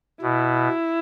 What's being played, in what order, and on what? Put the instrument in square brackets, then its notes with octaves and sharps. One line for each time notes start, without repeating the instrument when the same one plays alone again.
[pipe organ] B2 [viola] E4